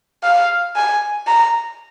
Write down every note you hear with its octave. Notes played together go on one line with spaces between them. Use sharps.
F5
G#5
A#5